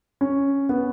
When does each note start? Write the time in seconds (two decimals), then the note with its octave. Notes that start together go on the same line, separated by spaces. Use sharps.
0.21 C#4
0.69 B3